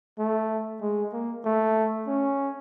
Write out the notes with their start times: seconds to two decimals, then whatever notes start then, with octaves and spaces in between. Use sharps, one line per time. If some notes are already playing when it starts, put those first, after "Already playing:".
0.19 A3
0.81 G#3
1.13 A#3
1.44 A3
2.07 C#4